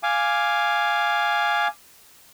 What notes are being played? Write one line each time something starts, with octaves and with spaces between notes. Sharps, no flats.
F5 G#5 D6